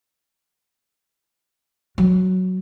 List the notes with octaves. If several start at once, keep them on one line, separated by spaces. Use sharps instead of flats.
F#3